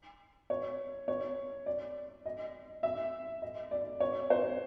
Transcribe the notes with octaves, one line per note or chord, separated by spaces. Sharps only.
C#5
C#5
D5
D#5
E5
D#5
D5
C#5
C5